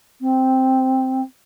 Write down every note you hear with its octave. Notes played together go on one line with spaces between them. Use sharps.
C4